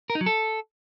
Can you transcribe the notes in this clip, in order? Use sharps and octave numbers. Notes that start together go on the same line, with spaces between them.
A#4
D#4
F#3
A4